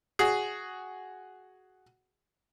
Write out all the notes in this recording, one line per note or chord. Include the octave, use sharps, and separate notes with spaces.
F#4 G#4